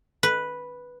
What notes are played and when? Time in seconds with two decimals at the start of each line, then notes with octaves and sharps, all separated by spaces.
0.23 B4